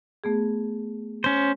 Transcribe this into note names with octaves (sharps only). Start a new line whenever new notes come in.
A3 B3 G#4
C#4 C5